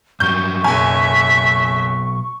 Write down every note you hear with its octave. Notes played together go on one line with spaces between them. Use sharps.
G2 F#3 C#6 G6
F#1 B1 E5 G#5